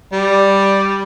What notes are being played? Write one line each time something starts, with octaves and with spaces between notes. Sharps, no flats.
G3 D5